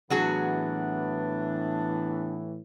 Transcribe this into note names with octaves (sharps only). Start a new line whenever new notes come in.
A2 E3 F#3 B3 D4 F#4 G#4